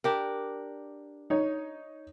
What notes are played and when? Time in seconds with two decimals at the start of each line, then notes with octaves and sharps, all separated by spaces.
0.04 D4 G4 A#4
1.30 D#4 C#5